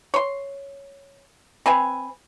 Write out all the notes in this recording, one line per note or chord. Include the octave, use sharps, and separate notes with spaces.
C#5 C6
C4 B4 G#5